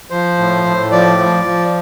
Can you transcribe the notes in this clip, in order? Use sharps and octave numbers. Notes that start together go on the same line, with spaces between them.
F3 C5
A2
A2
F3 D5
F3
F3